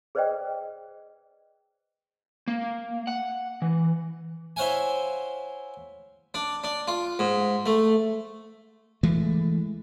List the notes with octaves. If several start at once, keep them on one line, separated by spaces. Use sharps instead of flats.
G#4 B4 C5 D5 D#5 G5
A#3
F#5
E3
E4 C5 C#5 F5 F#5 G#5
D4
D4
F4
G#2
A3
E3 G#3 A3